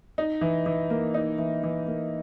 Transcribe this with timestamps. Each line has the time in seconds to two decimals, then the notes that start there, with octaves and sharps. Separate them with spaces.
0.18 D#4
0.41 E3
0.66 E3
0.90 A#3
1.14 D#4
1.38 E3
1.63 E3
1.87 A#3